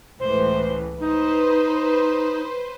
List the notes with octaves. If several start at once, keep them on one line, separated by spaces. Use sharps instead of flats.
C#2 A2 E3 C5
D#4 B4 C5